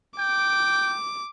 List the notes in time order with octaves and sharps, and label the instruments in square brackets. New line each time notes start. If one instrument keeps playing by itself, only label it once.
[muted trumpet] G5 [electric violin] D6